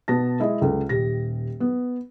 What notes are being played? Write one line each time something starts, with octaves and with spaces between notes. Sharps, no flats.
B2 B3 A5 A#6
G#3 E4 G#4 D#5
C#2 A4
D#1 G4 A#6
B3